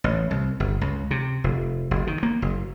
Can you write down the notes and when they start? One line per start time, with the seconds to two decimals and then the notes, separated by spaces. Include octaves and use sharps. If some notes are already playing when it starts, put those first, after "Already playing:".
0.04 A1
0.31 C2
0.60 G1
0.81 C#2
1.11 C3
1.44 F1
1.91 F#1
2.07 D#3
2.23 A#3
2.42 F#1